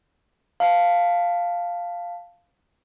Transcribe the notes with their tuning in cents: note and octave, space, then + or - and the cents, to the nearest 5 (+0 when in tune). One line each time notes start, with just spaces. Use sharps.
F5 +0 A5 +0